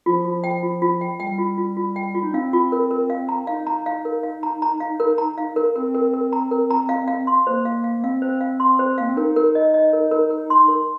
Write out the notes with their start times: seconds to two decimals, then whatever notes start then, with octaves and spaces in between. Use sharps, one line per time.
0.06 F3 F4
0.25 F4
0.44 G5
0.63 F4
0.82 F4
1.01 G5
1.20 G3 G5
1.38 F4
1.58 F4
1.77 F4
1.96 G5
2.15 F4
2.23 D#4
2.34 C4 F5
2.53 F4
2.72 A#4
2.91 A#4
3.10 F5
3.29 A#5
3.47 D#4 F5
3.67 A#5
3.86 F5
4.05 A#4
4.23 F5
4.43 A#5
4.62 A#5
4.80 F5
5.00 A#4
5.18 A#5
5.38 F5
5.56 A#4
5.75 C4 A#4
5.94 A#4
6.14 A#4
6.33 A#5
6.51 A#4
6.70 A#5
6.89 F5
7.08 F5
7.27 C6
7.46 A#3 C5
7.65 F5
7.84 F5
7.98 A#3
8.04 C4 F5
8.22 C5
8.41 F5
8.60 C6
8.79 C5
8.98 A#3 F5
9.09 C4
9.16 D#4 A#4
9.36 A#4
9.55 D#5
9.74 D#5
9.93 A#4
10.11 A#4
10.30 A#4
10.50 C6
10.68 A#4